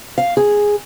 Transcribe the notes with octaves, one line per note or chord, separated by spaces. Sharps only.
F5
G#4